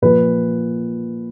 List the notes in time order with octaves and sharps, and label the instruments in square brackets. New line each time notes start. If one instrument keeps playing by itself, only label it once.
[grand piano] A#2 F3 B4